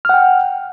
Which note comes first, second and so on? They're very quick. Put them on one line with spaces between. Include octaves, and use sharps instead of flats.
F6 F#5 G5